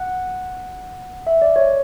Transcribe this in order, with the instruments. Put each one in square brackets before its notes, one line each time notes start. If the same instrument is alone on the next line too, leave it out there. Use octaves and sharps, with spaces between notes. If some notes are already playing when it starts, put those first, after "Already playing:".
Already playing: [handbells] F#5
E5
D5
C#5